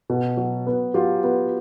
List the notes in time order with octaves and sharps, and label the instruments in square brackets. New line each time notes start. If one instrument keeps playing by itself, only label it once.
[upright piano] B2
F#3
B3
[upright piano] F#3 [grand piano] F4 G4
[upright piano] B3